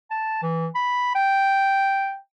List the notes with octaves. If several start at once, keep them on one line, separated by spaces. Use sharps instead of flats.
A5
E3
B5
G5